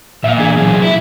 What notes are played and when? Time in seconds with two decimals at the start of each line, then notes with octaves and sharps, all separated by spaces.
0.24 A#2 E5 F5
0.37 E3 D4 G#4
0.57 F#2 C3
0.82 E4